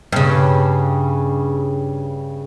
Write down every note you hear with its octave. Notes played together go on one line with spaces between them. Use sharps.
G2 C#3